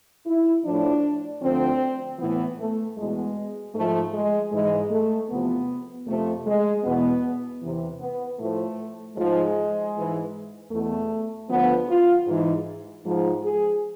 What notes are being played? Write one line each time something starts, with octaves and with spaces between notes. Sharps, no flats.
E4
A2 F3 D4
D2 D3 F3 C4
A2 E3 B3
A3
E2 B2 G#3
G#2 F3 A3
G#3
G#2 E3 G#3
A3
E2 C3 F3 B3
F2 C3 F3 A3
G#3
E2 B2 B3
E2 C3 E3
B3
A2 F3 A3
G#2 F3 G#3
G#2 E3
E2 B2 A3
D2 D3 F3 B3
F4
G#2 E3
G#2 F3
G#4